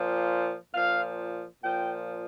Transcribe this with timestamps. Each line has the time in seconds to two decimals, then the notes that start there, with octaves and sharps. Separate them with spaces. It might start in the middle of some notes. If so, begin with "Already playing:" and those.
Already playing: A#2 F3
0.73 A#2 F3 F5
1.63 A#2 F3 G5